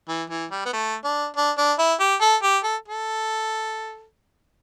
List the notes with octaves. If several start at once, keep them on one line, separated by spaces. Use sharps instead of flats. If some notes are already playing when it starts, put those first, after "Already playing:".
E3
E3
G3
B3
A3
D4
D4
D4
E4
G4
A4
G4
A4
A4